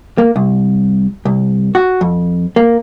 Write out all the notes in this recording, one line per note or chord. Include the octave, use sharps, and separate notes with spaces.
A#3
C2
C2
F#4
F2
A#3